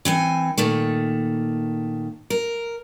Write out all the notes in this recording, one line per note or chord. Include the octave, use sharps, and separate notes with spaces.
E3 C4 G#5
A#2 D#3 A3
A#4